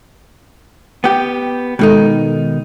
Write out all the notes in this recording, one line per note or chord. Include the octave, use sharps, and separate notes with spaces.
B3 G4
B2 D#3 G#3 D#4 A4